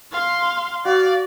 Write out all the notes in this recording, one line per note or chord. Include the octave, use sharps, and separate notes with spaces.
F5 C6
F#4 D5 F5